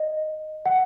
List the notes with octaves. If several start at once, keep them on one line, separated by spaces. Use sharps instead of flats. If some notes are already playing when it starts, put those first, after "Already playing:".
Already playing: D#5
F#5